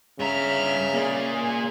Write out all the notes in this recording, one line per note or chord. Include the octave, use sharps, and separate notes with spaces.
G2 C#3 E5 A#5 F6
A#3 G#4 D5